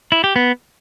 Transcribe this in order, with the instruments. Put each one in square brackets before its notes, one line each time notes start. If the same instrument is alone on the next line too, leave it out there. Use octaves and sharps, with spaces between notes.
[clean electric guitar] E4
G4
B3